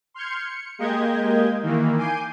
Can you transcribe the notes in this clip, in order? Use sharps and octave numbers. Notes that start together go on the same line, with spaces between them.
C6 F6 G6 G#6 C#7
C#7
G#3 A#3 G4 D#5 G6 G#6
D#3 E3 A#3
G#5 D6 G6 C7 D#7